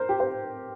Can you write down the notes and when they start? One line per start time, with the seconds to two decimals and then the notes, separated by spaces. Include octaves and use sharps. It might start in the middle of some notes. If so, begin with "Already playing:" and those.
Already playing: A#4 C5
0.09 G4
0.20 C5